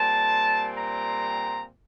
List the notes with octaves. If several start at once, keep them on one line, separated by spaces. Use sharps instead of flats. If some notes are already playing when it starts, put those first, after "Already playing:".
Already playing: A#2 G3 C4 A5
A#5